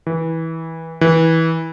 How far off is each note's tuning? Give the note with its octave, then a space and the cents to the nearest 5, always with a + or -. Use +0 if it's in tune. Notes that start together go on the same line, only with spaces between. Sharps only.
E3 -20
E3 -20